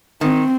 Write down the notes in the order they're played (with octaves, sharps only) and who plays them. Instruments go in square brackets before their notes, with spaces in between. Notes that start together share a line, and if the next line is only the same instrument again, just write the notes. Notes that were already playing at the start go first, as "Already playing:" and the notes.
[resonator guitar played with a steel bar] D#3 [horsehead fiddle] C4